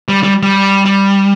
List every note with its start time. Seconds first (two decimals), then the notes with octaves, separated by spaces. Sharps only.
0.08 G3
0.23 G3
0.43 G3
0.85 G3